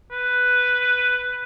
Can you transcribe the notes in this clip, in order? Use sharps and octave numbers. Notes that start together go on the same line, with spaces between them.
B4